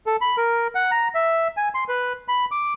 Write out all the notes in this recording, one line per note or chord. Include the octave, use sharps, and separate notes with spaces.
A4
B5
A#4
F#5
A#5
E5
G#5
C6
B4
B5
D6